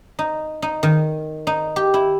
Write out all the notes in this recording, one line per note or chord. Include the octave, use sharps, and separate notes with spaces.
D#4
D#4
D#3
D#4
G4
E4